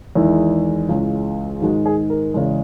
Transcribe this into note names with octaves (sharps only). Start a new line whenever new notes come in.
E2 D#3 G#3 E4
C#2 C#3 E3 G#3
G#2 D#3 G#3 F#4
G#4
A#4
E2 C#3 E3 G#3